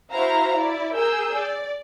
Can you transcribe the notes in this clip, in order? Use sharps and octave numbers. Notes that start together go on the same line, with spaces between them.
E4 F#4 C5 E5 F5 A#5
E4 D5
G#4 A#4 E6 G6
D5